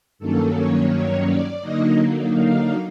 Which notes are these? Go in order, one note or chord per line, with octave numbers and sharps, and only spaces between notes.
G2 D#3 F#3 A#3 C#4 A4
C#5
C#5
D5
D3 F#3 A#3 D#4 D#5
F5